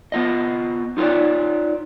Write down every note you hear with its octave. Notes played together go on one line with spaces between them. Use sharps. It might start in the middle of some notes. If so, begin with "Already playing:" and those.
B3 F4 D#5
D#4 F4 A4 C#5 D5